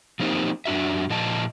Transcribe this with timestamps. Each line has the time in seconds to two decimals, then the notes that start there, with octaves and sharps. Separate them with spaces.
0.20 F3 A#3 C4 D#4 G4
0.65 F#2 D4 F#4 E5
1.10 A#2 F3 D#5 A5